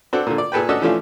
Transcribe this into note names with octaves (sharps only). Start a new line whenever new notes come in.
C4 D4 F#4 A4
A#2 D3
D5
A#2 G#4 A4 B4 G5
C#4 D4 F#4 A4 D#5 E6
E3 F3 A3 C#4 D4 F4